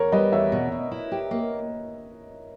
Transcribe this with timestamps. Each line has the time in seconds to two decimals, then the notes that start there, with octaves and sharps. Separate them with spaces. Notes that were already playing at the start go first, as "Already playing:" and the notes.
Already playing: E2 A#4 C#5
0.12 G3 B4 D#5
0.32 E2 C#5 E5
0.52 B2
0.72 B2
0.92 E4
1.12 G4
1.31 A#3